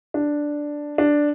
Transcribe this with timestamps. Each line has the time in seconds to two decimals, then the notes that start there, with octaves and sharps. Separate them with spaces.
0.14 D4
0.98 D4